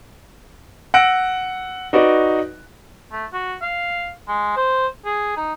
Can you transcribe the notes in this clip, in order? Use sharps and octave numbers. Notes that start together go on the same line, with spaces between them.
F#5 E6 F#6 A#6 D7
D#4 F#4 B4 D5 D#5
A3
F#4
F5
G#3
C5
G#4
D#4